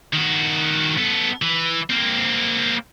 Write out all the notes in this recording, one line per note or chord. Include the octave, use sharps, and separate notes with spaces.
D#3 F#4
B3 A4
E3
A#3 C4